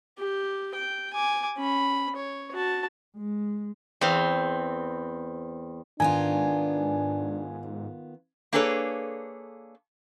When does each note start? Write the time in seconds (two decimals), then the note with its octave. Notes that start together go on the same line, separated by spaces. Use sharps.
0.18 G4
0.75 G5
1.13 G#5 D6
1.57 C#4 B5
2.16 C#5
2.53 F#4 A5
3.17 G#3
4.01 E2 C4 F5
6.00 G#2 D#3 B3 D4 F4 G#5
8.53 A#3 D4 G#4 A4 B4 C#5